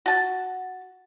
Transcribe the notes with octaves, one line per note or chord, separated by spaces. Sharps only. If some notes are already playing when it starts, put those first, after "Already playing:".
F#4 A5